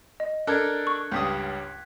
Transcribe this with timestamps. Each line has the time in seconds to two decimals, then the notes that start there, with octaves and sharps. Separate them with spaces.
0.20 D#5
0.47 D4 A4 A#4 F#6 G#6
0.87 C#6
1.12 C#2 G2 D#6 G6 B6